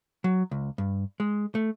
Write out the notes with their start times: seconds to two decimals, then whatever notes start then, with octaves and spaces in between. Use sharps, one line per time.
0.24 F#3
0.51 C#2
0.78 G2
1.20 G#3
1.55 A3